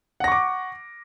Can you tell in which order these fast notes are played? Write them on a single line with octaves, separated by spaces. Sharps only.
F#5 A#6 C#6 D6